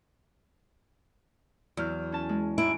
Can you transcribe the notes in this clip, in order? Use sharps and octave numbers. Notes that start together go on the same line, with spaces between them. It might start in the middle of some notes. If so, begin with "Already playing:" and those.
E2 F#3 F6 G6
C#4 A5
G#3
G#2 E3 E4 D7